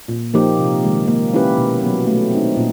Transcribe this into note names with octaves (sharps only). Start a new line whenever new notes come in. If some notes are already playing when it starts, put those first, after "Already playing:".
A#2
F3 A#3 D#4 G4
C3
D#3 G#3
A#3
C#4 E4 G4 B4
B2
F#3 B3
A3
C4 D#4
A#2